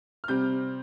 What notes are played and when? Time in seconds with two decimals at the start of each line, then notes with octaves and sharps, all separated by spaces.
0.24 F6
0.28 C3 G3 C4 G6